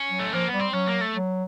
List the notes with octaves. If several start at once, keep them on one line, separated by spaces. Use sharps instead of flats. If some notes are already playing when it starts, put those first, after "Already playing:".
Already playing: C#4
F#3
A3
F3 A#3
B3
G3
C4
F#3 C#4
A#3
A3
F#3